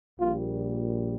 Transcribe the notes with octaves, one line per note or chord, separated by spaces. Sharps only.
A#1 A#2 G3 F4